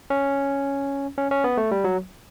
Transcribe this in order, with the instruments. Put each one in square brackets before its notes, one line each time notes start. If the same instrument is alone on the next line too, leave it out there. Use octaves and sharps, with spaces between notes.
[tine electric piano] C#4
C#4
C#4
B3
A3
G3
F#3